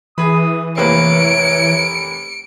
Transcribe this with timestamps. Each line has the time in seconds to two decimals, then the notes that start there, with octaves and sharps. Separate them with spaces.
0.18 E3 G#4 B5 D#6
0.77 F1 A#3 B4 C#5 C#7 D7